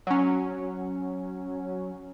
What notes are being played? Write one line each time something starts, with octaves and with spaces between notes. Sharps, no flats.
F#3 C#4